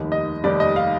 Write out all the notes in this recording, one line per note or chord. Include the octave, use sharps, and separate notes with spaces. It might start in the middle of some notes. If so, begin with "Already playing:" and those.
Already playing: F1 D#2 D#3 G3
D#5
F1 D#2 D#3 G3 D5
D#5
F5